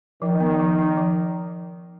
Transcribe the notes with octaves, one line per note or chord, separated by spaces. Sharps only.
D#3 F3
B3
F3
D#4
F3